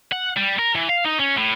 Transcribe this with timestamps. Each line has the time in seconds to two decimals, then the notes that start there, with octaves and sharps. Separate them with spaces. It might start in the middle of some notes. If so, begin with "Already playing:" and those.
0.12 F#5
0.37 G3
0.59 A#4
0.76 E3
0.89 F5
1.06 D#4
1.20 C#4
1.38 A2